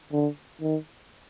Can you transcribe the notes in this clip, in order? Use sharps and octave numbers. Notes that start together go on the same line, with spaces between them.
D3
D#3